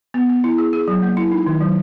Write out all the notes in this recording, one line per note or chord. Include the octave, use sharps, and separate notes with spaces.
B3
B3
E4
G#4
G#4
F#3
A#3
E4
D#4
D#3
F#3